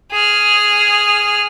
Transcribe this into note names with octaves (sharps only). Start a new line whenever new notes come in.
G#4 F6